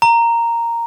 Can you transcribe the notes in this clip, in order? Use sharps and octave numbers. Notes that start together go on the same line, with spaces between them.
A#5